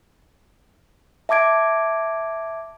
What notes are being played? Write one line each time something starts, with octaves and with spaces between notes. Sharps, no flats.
E5 A5 D6 G#6 D7